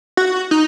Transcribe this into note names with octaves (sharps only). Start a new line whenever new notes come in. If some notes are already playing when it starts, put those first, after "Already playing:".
F#4
D#4